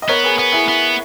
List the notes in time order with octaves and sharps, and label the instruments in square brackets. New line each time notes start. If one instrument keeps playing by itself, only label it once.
[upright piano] D#5
[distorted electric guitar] B3 [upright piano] A#4 C#5
[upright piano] G#4 B4
[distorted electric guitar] B3
[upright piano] E4 G#4
[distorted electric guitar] B3